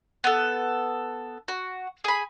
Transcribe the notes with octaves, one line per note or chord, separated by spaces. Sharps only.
B3 A4
F#4
G#4 B5